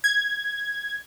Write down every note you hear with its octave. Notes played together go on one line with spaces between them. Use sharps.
G#6